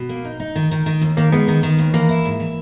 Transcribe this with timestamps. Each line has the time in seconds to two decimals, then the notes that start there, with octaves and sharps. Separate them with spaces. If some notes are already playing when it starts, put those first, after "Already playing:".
Already playing: B2
0.09 A#3
0.25 D#4
0.40 D#4
0.55 D#3
0.71 D#3
0.86 D#3
1.01 D#2
1.17 D#3 A#3
1.32 G#3 B3
1.48 D#3
1.63 D#3
1.78 D#2
1.94 E3 A#3
2.09 E4
2.25 G#2
2.40 E3